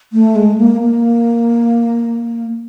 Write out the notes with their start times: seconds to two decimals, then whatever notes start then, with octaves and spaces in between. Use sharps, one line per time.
0.13 A3
0.36 G#3
0.58 A#3
0.81 A#3